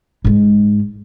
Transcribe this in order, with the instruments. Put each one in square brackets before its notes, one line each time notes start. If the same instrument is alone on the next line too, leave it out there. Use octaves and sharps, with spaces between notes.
[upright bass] G#2 G#3